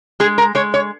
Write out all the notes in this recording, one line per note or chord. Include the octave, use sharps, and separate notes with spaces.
G#3 G#4
A#4
G#3 C#5
C#5